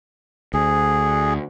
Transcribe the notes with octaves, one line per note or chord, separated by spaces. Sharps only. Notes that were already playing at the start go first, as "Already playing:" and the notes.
D2 G#4